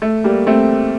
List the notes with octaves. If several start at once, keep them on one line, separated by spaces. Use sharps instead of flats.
A3
G3 A#3
A3 C4